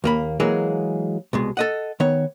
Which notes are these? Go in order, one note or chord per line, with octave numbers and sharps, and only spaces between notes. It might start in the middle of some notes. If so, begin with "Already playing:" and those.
D#2 A#3 B5
E3 F#3 G#3 A#3 G#4
C2 B2 G#3
A4 D#5 F#5
D#3 B3 C#5